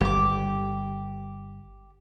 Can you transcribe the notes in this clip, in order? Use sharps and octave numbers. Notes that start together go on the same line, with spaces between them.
G1 G3 G4 D6